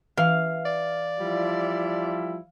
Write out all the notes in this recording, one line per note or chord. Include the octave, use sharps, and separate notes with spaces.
E3 F5
D5
F3 G3 E4